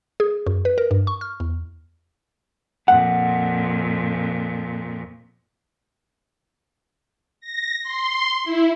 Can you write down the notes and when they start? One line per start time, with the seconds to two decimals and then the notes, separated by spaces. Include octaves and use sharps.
0.20 G#4
0.47 F#2
0.65 B4
0.78 A#4
0.91 G2
1.07 C#6
1.21 F6
1.40 E2
2.88 F2 A#2 F#5
7.41 A#6
7.83 C6
8.44 E4